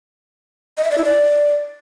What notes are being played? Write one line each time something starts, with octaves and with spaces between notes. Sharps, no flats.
D#5
E5
D5
E4
D5